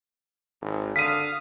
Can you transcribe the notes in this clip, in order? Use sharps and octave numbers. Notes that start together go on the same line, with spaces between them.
G#1
D3 F5 D#6 B6 D#7